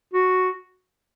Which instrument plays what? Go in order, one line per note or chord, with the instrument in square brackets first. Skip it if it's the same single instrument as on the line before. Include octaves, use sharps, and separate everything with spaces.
[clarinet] F#4